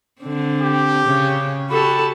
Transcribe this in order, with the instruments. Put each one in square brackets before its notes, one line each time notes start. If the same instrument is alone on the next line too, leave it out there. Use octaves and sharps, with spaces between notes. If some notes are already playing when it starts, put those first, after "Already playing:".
[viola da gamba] D3 C4
[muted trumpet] G4
[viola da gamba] C#3 C#4
[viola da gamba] F#4 G4 A4 [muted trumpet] B5